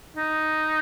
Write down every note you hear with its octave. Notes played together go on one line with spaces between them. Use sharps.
D#4